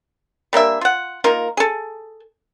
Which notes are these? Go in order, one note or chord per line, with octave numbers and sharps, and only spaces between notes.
G3 A#3 D4 E5
F4 F#5
A#3 D#4 F4 A#4
G#4 A4